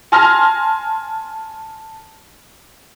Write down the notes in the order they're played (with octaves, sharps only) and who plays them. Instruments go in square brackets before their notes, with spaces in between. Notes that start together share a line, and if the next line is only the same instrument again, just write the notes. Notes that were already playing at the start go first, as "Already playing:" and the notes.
[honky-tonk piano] G#5 A5 C6 F6 A#6